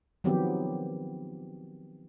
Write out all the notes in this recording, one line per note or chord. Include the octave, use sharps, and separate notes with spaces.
D#3 F3 F#3 B3 C4 G4